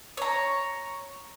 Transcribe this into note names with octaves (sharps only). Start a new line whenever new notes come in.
C#5 A#5